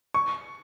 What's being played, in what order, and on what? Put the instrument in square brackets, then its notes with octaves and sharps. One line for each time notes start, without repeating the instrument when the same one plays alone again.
[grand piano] C#6